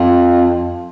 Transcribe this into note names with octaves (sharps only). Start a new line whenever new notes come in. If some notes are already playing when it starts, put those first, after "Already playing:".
Already playing: F2